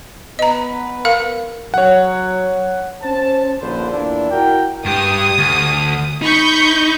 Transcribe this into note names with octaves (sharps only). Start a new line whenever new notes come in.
B3 B4 D#5 A#5
A#4 F5
F#3 C#5 F#5
C#4 C5 A5
A#1 D#2 D3 B4 C5
E2 A#2 D4 E4
E4 F#4 A#4 G5
G2 G4 D#6
D2
D#4 B5 C#6 G6